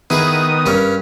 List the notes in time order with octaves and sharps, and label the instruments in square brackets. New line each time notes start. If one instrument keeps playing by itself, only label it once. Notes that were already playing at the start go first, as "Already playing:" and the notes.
[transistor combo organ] D#3 B3 D#6 [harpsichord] E4 G#4 B4
[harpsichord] G2 C#4 A#4